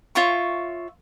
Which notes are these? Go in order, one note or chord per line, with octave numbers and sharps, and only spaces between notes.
F4 C#5 E5 C#6